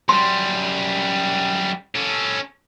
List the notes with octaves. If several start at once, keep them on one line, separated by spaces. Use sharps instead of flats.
F#2 G3 C6
C#4 A4